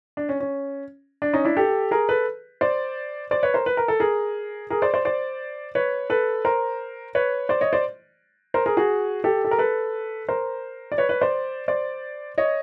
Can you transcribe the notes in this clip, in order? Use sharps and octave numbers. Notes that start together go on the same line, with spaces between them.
D4
C#4
C#4
D4
C#4 D#4
D4 E4
G4 A4
G#4 A#4
A4 B4
C5 D5
C5 D5
B4 C#5
A#4 C5
B4
A#4
A4
G#4 A#4
G#4 A#4
C5 D5
C5 D5
C5 D5
B4 C#5
A4 B4
A#4 C5
B4 C#5
C5 D5
C#5 D#5
C5 D5
A#4 C5
G#4 A#4
F#4 G#4
G4 A4
A4
A#4
A4 B4
A#4 C5
D5
B4 C#5
B4 C#5
C5 D5
C5 D5
C#5 D#5